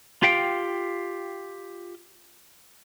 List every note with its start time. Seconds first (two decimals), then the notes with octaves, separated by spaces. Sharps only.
0.23 F4 G4 F5 G5